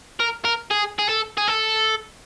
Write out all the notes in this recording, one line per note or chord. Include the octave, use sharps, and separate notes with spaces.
A#4
A#4
G#4
G#4
A4
G#4
A4